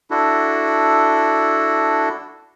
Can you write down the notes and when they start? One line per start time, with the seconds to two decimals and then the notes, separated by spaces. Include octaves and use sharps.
0.11 D4 E4 F#4 A4